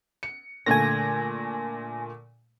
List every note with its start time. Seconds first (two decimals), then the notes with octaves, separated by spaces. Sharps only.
0.23 C#7
0.66 A#2 D3 A3 G#5 A#6